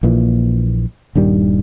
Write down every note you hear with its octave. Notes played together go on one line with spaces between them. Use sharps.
A#1 A#2 E3
D#1 G2 D#3 G3